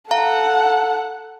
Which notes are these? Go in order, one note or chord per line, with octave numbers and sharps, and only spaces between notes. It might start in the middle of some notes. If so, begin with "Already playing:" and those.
A4 F5 F#5 A#5